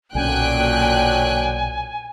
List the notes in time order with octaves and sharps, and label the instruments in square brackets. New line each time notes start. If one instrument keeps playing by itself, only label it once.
[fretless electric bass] B1 C#4 [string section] A#2 G5 F#6 [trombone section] D3 F#3 [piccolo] G#5